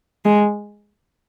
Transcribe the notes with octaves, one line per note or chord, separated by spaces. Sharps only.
G#3